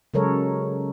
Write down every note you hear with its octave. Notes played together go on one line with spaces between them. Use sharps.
C#3 F#3 G#3 A4 A#4 C#5